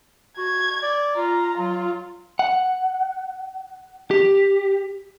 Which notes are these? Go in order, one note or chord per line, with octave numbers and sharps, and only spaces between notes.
F#4 G#6
D5
F4 A#5
F#3 F4
F#5
G4